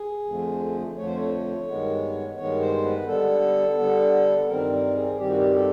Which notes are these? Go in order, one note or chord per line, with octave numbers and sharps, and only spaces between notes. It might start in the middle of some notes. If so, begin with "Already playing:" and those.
Already playing: G#4
F2 D3 F3 A3
F2 D3 F3 A3 C#5
C5
C#5
G2 D#3 G#3 B3
G2 D#3 G#3 B3 C#5
C5
B4
D3 G3 B3 A4
D3 G3 B3
G2 D#3 G3 C4 A#4
A#4
G#4
G2 D#3 G3 C4 G4
F#4
G4
A4